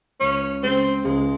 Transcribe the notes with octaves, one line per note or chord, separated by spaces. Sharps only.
C#2 C#4
C#3 G#3 C4
C#2 G#3